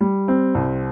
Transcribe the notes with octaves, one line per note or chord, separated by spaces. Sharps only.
G3
C4
C2